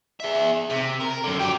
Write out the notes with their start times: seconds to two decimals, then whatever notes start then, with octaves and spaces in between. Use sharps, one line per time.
0.20 G#4 E5
0.70 C3
1.00 A#4
1.24 F#2 D3
1.40 F#3 G4